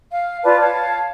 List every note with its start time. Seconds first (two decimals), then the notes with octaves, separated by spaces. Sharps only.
0.11 F5
0.43 F4 B4 D5 A5
0.60 C#5 F5 A5